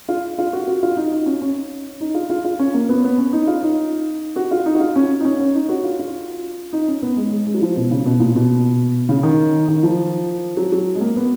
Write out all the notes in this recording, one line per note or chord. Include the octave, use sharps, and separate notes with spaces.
F4
F4
F#4
F#4
F4
D#4
D#4
C#4
C#4
D#4
F4
F4
F4
C#4
A#3
B3
B3
C#4
D#4
F4
D#4
F#4
F4
D#4
F#4
F4
C#4
D#4
C#4
C#4
D#4
F#4
F4
F4
D#4
C#4
B3
G#3
G#3
G#3
F#3
F3
B2
C#3
B2
A#2
B2
C#3
D#3
D#3
F3
F#3
F#3
G#3
A#3
B3